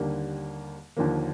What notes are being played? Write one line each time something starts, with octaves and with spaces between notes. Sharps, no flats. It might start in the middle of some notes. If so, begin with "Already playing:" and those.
Already playing: D#2 D3 G3 A#3
D#2 D3 F3 A#3